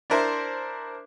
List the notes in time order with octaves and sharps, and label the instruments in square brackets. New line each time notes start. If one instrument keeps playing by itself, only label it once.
[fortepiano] D4 E4 A#4 C5